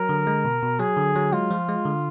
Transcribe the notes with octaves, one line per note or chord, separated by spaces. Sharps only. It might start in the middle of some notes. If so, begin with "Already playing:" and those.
Already playing: F#3 A#4
D3
G#3
B2
B2
F#3 G#4
D3
F#3
G#3 F4
F3
G#3
D3